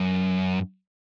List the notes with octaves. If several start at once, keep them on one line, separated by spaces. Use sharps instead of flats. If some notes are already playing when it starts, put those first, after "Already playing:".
Already playing: F#2